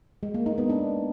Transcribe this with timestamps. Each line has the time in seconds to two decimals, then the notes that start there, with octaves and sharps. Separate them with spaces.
0.23 G#3
0.34 A#3
0.46 D#4
0.58 B3
0.70 D4